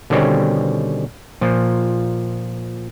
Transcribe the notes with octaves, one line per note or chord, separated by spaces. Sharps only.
B2 D3 D#3 G3 C4 C#4
A#2 F3